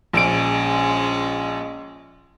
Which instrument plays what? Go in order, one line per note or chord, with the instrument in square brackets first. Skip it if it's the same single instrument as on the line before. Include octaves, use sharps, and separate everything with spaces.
[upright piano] A#1 D7 [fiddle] G#3 C#4